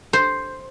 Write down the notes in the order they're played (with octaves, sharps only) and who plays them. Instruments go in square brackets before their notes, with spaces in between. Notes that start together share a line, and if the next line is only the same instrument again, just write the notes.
[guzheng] C5